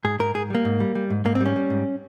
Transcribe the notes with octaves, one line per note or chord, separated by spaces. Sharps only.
G#2 G#4
G#2 A#4
G#2 G#4
G3 A#3
G#2
G3
G3
G#2
G#2 A#3
C4
G3
C#4
G3
G#2